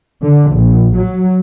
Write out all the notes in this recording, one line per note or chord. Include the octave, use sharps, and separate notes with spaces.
D3
A#1
F#3